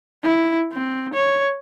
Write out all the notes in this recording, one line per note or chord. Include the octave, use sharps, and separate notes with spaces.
E4
C4
C#5